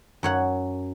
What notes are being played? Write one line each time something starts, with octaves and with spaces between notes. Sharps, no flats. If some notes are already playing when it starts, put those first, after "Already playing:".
F#2 C#5 F#5